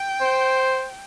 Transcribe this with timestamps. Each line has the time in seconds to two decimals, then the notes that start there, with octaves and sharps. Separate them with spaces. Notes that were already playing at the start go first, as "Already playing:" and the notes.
Already playing: G5
0.21 C5